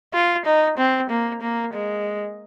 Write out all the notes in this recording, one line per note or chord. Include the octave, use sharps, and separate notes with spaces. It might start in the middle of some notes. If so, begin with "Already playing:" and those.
F4
D#4
C4
A#3
A#3
G#3